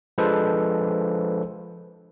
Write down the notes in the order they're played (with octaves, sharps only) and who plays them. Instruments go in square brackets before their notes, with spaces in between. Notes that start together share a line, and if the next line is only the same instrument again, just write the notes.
[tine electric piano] F3 G#3 D4 A4 B4 C5